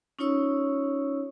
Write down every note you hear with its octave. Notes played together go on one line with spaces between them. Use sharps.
C#4 D#4 F4 C#5 C#6 E6